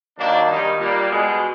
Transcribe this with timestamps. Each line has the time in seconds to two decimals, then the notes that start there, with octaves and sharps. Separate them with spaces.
0.18 G2 D#3 F#3 A#3 D4
0.49 G2 D#3 G3 D#4
0.79 A#2 G3 A#3
1.10 B2 G#3